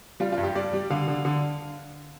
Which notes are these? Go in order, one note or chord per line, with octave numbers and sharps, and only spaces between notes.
G3 F4
F4
G2
G4
G3 D5
G3
D3 F5
D3
D3